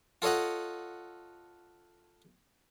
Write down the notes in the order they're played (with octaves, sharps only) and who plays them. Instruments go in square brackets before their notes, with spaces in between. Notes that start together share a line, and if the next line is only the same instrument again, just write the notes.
[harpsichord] F4 A4 C#5 D#5 F#5